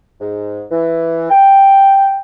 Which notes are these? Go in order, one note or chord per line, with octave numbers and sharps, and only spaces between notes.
G#2
E3
G5